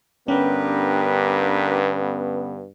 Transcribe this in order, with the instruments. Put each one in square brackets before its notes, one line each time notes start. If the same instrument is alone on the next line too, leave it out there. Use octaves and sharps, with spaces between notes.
[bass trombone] G2 [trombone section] D3 B3 [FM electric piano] C#4 D4 [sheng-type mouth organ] G4 A#4 B4